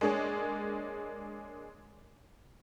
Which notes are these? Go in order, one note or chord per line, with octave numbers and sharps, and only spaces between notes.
G#3 A#3 D4 G#4 C#5 D#5